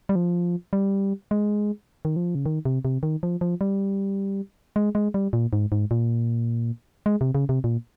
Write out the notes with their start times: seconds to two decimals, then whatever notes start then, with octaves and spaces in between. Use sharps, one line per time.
0.09 G3
0.16 F3
0.73 G3
1.31 G#3
2.05 D#3
2.16 F3
2.35 C#3
2.46 D#3
2.65 C3
2.85 C3
3.03 D#3
3.23 F3
3.41 F3
3.61 G3
4.76 G#3
4.95 G#3
5.14 G3
5.33 A#2
5.53 G#2
5.72 G#2
5.91 A#2
7.06 G#3
7.21 C3
7.35 C#3
7.49 C3
7.64 A#2